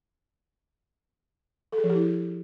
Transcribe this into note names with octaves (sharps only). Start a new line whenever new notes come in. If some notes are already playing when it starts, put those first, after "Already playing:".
A4
G#4
F3
G4
E4